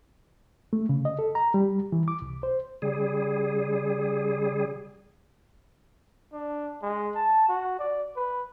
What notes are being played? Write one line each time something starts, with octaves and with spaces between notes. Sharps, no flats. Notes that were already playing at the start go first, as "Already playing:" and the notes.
A3
C#3
D#5
A4
A#5
G3
E3
D6
C2
C5
C#3 G3 G#4
D4
G#3
A5
F#4
D5
B4